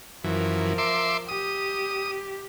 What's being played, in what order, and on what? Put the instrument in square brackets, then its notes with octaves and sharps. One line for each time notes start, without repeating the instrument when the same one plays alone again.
[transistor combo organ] F#2 E3 [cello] F3 A#4
[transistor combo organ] E5 C6 D6
[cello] G4 [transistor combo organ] D#6